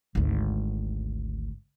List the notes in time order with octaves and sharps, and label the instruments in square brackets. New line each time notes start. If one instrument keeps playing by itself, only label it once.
[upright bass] G#1 D2